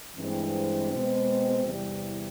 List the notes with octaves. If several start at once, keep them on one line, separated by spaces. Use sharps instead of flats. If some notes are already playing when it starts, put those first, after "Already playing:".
G2 E3 G#3 C4
B2 G#3 C4
E2 C3 E3 G3